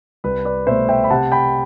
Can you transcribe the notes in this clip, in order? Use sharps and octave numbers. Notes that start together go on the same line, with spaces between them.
C2 B4
B4 D5
B2 A3 C5 E5
E5 G5
B5
C3 F#5 A5
G5 B5